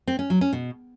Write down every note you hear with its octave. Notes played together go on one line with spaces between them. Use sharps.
C4
C#4
F#3
C#4
B2